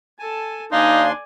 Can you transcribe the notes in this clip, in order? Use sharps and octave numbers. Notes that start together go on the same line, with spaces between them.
A4 G#5 A5
D#2 D4 D#4 D5 F5 G#5 C6